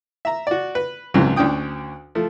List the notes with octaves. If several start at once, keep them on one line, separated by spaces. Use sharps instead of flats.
E5 A#5
F#4 D5
B4
C#2 G#2 C#3 F3 F#3 C4
D2 C#4 D4 G5 D#6
F3 A3